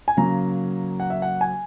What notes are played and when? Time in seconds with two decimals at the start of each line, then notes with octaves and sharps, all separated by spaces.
0.08 G#5
0.17 C#3 F#3 A#3 A#5
1.00 F#5
1.10 E5
1.22 F#5
1.41 G#5